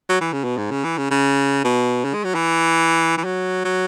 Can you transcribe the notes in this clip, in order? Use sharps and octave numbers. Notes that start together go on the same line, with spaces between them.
F#3
E3
C#3
B2
G#2
C#3
E3
C#3
C#3
B2
C#3
G#3
F#3
E3
E3
F#3
F#3